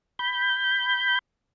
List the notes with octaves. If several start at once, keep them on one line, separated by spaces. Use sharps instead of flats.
B5 G6